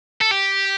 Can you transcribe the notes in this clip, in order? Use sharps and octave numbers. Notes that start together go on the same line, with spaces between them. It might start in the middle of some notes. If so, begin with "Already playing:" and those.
A4
G4